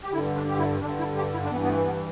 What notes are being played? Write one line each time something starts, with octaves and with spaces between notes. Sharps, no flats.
G4
G2 D3 E4
D4
G4
E4
G2 D3 D4
E4
G4
E4
D4
G2 E3 B3
B3
A3
B3